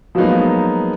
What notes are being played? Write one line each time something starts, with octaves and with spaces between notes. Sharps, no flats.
F3 F#3 G#3 A#3 B3 D#4